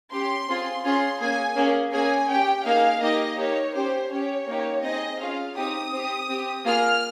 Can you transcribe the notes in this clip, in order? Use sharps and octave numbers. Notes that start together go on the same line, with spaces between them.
C#4 G4 C6
C4 F4 G#4
C#4 F4 G#4 C6
A#3 C#4 G#4 G#5
A#3 C#4 G#4
A#3 C#4 G#4 G#5
C#4 G4 G5
A#3 D#4 G#4 F5
A#3 D#4 G4 D#5
A#3 D#4 G4 C#5
C#4 G4 C5
C#4 G4 C#5
A#3 D#4 G4
C4 D#4 G#4 D#5
C#4 F4 G#4 F5
C4 D#4 G4 D#6
C4 G4
C4 G4
A#3 F4 G#4 F6